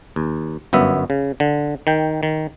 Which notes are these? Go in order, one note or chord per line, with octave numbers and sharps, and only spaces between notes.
D#2
G1 F#2 B3 E5
C#3
D3
D#3 G5
D#3